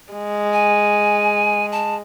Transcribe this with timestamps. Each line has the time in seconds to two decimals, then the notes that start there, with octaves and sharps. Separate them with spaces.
0.13 G#3
0.53 G#5
1.72 A5